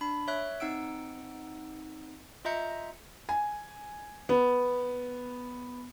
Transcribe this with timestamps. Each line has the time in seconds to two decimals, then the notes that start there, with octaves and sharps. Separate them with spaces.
0.01 D4 B5
0.28 C#5 E5 F#6
0.60 C4 D#4 F#5 E6 D7
2.45 F4 D#5 E5 A#5 G6 C#7
3.29 G#5
4.29 B3